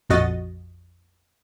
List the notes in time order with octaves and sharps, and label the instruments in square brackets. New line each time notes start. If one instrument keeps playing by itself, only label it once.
[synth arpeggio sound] A#1 F2 F#4 D#5 A6